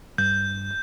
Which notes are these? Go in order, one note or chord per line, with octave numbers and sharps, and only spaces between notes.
G2 G6